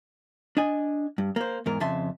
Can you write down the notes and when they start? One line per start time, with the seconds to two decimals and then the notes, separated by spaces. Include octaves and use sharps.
0.57 D4 D#5 G#5
1.18 G2
1.36 A#3 C5
1.66 E2 G#2 A#4
1.80 F2 C#3 E5 A5 C6